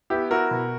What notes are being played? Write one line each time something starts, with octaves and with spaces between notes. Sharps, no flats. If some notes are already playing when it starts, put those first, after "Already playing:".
B3 E4 G4
E4 F#4 A#4
B2